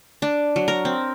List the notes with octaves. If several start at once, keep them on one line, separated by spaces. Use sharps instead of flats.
D4
F#3
A#4
C4